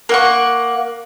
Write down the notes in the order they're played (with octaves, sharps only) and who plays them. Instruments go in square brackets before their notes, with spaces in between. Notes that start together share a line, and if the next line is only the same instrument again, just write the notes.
[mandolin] A#3 F#5 C#6